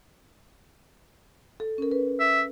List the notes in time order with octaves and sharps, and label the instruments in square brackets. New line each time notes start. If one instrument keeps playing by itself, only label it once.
[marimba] A4
C#4 A#4
B4
[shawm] E5